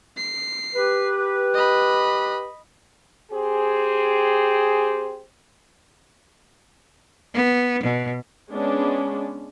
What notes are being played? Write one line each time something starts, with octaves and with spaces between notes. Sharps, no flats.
C7
G4 B4
D#5 B5
C4 G4 G#4
B3
B2
G#3 B3 C#4 D4